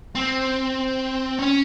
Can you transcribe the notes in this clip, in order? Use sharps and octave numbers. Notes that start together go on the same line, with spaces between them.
C4
C#4